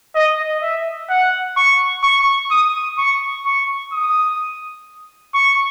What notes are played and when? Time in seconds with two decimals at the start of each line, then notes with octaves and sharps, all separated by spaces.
0.15 D#5
0.62 E5
1.10 F#5
1.57 C#6
2.04 C#6
2.51 D#6
2.98 C#6
3.46 C#6
3.93 D#6
5.34 C#6